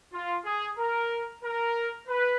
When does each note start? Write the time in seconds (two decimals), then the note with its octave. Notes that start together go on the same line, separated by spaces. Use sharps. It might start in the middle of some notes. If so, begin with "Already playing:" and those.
0.13 F4
0.45 G#4
0.77 A#4
1.43 A#4
2.08 B4